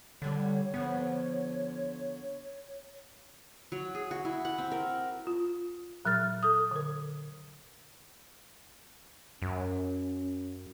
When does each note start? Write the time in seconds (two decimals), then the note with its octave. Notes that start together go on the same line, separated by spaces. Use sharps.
0.22 B2 D3 G3 B3 C#5
0.74 D3 F3 B3 F#4
3.72 F#3
3.95 G#4
4.11 F#4
4.25 E4
4.45 F#5
4.58 C4
4.72 A#4
5.27 F4
6.05 A#2 F#3 A#4 F6 A6
6.43 A4 D#6
6.71 D3 A#4
9.42 F#2 C#4